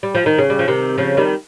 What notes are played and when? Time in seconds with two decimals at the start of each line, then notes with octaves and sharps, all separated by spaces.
0.03 G3
0.15 F3
0.26 D#3
0.38 C#3
0.50 G3
0.59 F3
0.68 C3 D#3
0.98 C#3 F3
1.17 D#3 G3